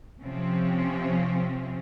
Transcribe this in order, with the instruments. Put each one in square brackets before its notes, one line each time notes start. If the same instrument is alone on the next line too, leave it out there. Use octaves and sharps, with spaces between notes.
[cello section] C3 F3 C4 C#4